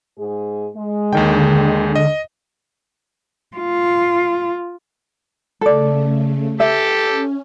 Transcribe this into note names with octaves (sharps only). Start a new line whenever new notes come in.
G#2 G#3 G#4
G#3
D#2 D3 D#3 G5
D#5
F4
C#3 A3 A4 D5
G4 A4 E5
C#4